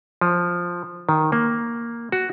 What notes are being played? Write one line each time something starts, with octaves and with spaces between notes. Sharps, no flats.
F3
D#3
A#3
F#4